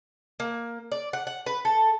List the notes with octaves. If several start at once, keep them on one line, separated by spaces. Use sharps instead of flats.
A#3
D5
F#5
F#5
B4
A4